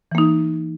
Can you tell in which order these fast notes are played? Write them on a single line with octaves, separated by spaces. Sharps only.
E3 A#3 D#4